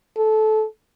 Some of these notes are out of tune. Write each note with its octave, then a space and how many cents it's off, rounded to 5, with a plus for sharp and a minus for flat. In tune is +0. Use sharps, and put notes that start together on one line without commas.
A4 -20